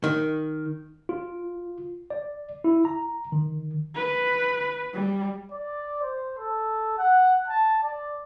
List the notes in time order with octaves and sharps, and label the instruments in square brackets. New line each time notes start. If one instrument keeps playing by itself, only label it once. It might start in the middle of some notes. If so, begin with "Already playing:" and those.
[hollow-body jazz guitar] D#3
[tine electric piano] F4
D5
E4
A#5
D#3
[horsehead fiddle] B4
G3
[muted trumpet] D5
C5
A4
F#5
A5
D5